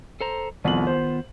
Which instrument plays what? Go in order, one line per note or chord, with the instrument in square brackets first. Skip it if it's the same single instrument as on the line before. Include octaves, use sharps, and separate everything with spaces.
[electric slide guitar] A4 C5 A#5
[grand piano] C2 F2 F#7 [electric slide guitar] D#3 B3 F4
[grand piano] C5